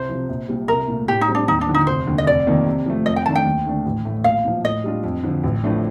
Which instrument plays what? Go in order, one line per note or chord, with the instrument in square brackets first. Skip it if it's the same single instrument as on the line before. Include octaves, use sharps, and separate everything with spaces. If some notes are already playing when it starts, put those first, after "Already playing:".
Already playing: [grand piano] C2 [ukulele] C5
[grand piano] C3 F3
A#1
A#2 G3
[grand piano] C2 [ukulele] A#4
[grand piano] A#2 A3
[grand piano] A2 [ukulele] G4
[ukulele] D#4
[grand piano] G3 C4
[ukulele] D4
[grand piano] D#2 [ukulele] D#4
[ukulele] D4
[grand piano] D3 F3
[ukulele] D#4
[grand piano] F1 [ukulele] C5
[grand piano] D#2 D3
[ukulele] D#5
[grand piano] F1 [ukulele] D5
[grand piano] F2 D#3 A#3
C3
F3 A3
[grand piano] F2 [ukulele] D#5
[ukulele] G5
[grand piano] D#3 A3 D4 [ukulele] A5
[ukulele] G5
[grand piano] D#2
D3 A3 D4
A1
A2 A3
[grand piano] A#1 [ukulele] F5
[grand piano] A#2 F3
[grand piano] A2 [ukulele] D#5
[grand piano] G3 D4 F4
F2
D3 F3
A1
A2 F3 A3 D4